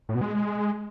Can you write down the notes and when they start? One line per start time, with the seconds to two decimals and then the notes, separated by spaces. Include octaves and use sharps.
0.09 A2
0.15 B2
0.21 G#3